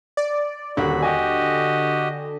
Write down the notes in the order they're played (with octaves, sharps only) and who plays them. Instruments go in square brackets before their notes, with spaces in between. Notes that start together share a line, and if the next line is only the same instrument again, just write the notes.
[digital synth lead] D5
[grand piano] D#1 [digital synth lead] D3 [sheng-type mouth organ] F#4 B5
[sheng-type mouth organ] F#4 G4 D#5 [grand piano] G5 G#5